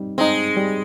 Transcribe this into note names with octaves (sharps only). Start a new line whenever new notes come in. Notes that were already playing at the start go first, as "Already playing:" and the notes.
Already playing: G3 C4 D#4
G#3 C4 D#4
G3